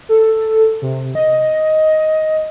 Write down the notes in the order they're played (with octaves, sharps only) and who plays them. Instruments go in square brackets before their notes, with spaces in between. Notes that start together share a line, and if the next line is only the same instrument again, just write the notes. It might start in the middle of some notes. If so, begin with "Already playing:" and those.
[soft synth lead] A4
C3
D#5